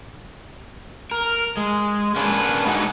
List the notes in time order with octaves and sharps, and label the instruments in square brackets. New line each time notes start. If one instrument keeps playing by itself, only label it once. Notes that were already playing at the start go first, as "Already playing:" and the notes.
[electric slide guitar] A#4
G#3
A#3 C#4 D4 B4
G#3 D#4 F#4 G#4 D#5 F#5